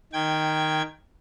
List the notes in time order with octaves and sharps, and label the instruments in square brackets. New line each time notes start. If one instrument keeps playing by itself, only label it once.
[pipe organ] D#3 G5 G#6